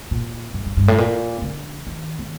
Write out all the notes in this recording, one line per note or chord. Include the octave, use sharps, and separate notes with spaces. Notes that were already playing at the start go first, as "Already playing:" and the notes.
A#2
G2
G2
G2
A2
A#2
D3
D#3
D#3